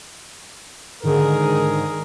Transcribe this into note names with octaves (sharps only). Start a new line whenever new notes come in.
G#2 D3 D#3 G#4 A#4